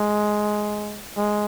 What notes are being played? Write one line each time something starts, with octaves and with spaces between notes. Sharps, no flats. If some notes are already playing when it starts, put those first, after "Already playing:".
Already playing: G#3
G#3